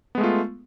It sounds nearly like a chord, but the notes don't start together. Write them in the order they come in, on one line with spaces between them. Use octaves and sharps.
B3 G#3 A3 F4